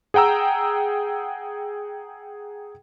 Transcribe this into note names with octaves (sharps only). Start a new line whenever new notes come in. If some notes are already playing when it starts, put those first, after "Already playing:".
G#4 F#5 G5 A#5 E6